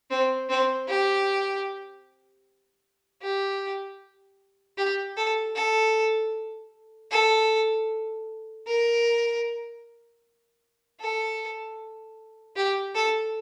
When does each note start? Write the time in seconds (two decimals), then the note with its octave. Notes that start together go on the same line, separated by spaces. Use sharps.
0.11 C4
0.49 C4
0.89 G4
3.22 G4
4.78 G4
5.17 A4
5.56 A4
7.11 A4
8.67 A#4
11.00 A4
12.56 G4
12.95 A4